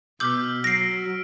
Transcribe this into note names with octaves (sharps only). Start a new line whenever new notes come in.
B2 D6 E6 F6 G6 B6
F#3 A#6 C7 D7